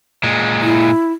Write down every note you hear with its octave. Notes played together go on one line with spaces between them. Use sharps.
A#2 G#3
E4